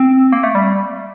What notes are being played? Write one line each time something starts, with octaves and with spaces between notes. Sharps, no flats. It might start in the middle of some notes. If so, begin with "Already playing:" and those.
Already playing: C4
A#3
A3
G3